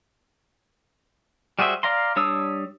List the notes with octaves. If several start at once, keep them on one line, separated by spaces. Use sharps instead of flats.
G3 F#4 G#4 C5 E5
D5 F5 A#5 C6
G3 D4 C#5 D#6 E6